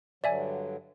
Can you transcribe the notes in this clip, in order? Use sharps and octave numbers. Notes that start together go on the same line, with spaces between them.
G2 D3 F#3 D5 E5 G#5